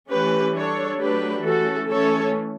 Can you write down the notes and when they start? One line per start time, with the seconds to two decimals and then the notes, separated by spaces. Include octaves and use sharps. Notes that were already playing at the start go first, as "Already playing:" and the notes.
0.10 E3 A3 C#4 G4 B4
0.56 G3 D4 A4 C#5
1.00 F#3 A3 D4 G4 B4
1.45 E3 A3 C#4 F#4 A4
1.91 E3 A3 C#4 A4 C#5